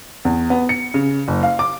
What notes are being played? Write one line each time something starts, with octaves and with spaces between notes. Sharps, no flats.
E2
B3
C#7
C#3
F#1
F5
D6